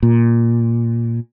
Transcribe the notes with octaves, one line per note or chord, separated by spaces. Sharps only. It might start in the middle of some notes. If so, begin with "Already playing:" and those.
A#2